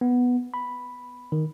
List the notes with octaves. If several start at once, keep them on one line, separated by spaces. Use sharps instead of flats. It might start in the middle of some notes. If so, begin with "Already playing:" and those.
B3
B5
D#3